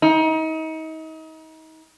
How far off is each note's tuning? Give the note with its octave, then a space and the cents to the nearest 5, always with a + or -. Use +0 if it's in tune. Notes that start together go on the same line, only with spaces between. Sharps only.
D#4 +35